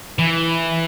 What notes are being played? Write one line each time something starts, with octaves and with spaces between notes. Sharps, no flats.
E3